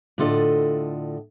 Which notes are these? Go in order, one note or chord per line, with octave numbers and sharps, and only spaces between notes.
A2 D3 F4 A4 D5 D#5